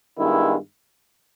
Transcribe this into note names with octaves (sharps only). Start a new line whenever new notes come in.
G2 D#3 G#3 B3 E4